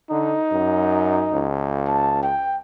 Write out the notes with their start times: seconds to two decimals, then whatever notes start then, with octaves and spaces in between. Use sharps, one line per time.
0.11 D3 D#4
0.51 F#2
1.33 C#2
1.87 A5
2.23 G5